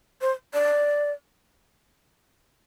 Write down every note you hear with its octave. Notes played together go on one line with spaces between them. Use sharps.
C5
D5